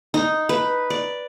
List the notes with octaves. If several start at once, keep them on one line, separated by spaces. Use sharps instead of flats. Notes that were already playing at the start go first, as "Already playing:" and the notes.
D#4
B4
D5